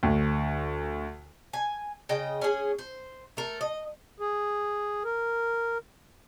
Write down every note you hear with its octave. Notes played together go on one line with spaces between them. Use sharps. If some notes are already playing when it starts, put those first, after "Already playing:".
D2
G#5
C#3 D#5 G5
C#4 G#4
C5
A3 A#4
D#5
G#4
A#4